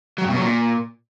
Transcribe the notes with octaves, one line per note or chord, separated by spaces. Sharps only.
F#3
G2
B2
F#3
A#2